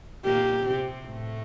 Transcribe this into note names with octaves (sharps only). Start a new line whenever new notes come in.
A#2 A#3 G4
C3 C4
A2 A3